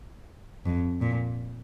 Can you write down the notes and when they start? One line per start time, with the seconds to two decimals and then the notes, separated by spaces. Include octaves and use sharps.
0.65 F2
1.01 A#2